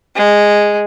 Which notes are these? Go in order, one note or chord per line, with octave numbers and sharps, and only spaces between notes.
G#3